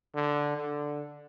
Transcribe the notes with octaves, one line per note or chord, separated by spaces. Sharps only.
D3
D3